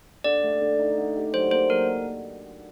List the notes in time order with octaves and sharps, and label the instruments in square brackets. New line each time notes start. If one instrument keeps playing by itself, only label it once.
[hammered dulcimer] D3 [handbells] D5
[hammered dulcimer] A3
D3
D#4
D3
G4
[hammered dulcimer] F#3 [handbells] C5
[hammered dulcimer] A#3 [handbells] C5
[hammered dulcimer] F#3 [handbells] A#4